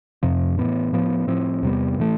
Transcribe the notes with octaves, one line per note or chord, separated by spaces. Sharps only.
F2 C3 F3
A2 E3 B3
A2 F3 B3
A2 F3 C4
E2 C3 G3 B3
A2 E3 A3